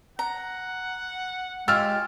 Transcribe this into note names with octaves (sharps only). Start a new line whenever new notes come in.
F#5 A#5
G#3 F4 G4 C#5 E6 F6